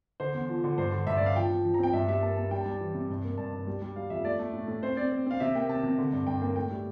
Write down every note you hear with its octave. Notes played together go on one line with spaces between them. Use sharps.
D3 C5
E2
F3
D3
G2 C5
D3
G2 E5
G2 D5
F5
F3 G5
F3
F3
A#5
C4 G5
G2 E5
G3 E5
A#3 A5
A#3 A5
G3 G5
A5
G3
A5
E3
C3
G2
A#3
G2 A5
G2
G3
G3
G3 F5
F2 E5
A3 D5
A3
A2
A2
C4 C5
C4 D5
C4
C4 F5
C3 E5
A#3 G5
C3 A5
C3
D3
G2
G2 G5
A#3 G5
A2 G5
G3